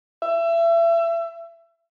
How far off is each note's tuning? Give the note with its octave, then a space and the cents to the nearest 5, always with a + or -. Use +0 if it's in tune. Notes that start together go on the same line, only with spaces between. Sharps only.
E5 +30